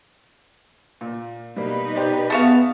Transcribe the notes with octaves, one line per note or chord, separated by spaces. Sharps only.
A#2
B2 G3 A#3 D#4 B4
G4 C5 D5
A3 B3 F#4 G#4 F5